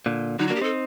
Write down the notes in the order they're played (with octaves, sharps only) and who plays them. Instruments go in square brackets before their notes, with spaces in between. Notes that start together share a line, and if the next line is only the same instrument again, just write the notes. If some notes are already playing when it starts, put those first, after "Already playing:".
[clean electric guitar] A#2 D3
[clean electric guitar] D3 F#3 [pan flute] D#4
[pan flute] F#4
[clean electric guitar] A#3 D4
[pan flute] G4
[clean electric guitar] C4 D#4 [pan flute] A4